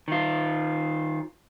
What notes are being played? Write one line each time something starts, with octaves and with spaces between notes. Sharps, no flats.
D#3 F4